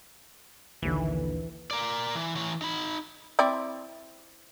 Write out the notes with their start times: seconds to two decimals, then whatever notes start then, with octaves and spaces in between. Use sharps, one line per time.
0.82 A#1 D#2 D3 E3
1.71 A#4 D5
2.15 E3
2.36 E3 C#5
2.62 D#4 B5
3.39 C4 E4 D5